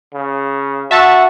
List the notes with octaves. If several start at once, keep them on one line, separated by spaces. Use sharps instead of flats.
C#3
F#4 E5 A5